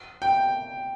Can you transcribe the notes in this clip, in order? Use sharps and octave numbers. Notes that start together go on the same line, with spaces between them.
G5